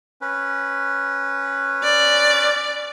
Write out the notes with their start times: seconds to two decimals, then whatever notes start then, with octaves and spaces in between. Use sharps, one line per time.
0.21 C#4 B4
1.83 D5